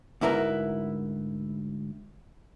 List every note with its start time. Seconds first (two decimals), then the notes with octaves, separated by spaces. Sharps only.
0.21 D2 G#2 E4 A#4 B4